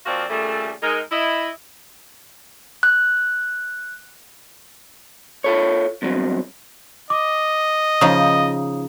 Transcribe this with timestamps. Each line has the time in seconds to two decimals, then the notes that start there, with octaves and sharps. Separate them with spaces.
0.06 A#2 F3 C4 F#4 D5 F5
0.29 A#2 C#3 G3 A3
0.82 G#3 D#4 A#4
1.11 E4 D#5
2.83 F#6
5.44 F4 A4 C#5
6.02 E2 G2 F#3 C4
7.10 D#5 D6
8.01 C#3 F3 D#4 C#5 D#6